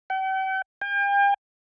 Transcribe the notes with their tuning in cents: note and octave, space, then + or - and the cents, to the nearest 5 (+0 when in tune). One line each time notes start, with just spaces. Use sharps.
G5 -45
G5 +40